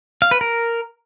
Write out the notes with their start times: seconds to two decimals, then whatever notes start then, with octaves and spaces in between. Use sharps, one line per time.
0.22 F5
0.31 B4
0.41 A#4